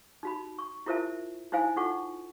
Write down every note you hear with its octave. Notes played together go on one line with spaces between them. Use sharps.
D#4 F#4 B5
C#6
E4 F4 A#4 C5 E5 A5
D#4 E4 C5 F5 G#5
D#4 F4 A4 F#5 C#6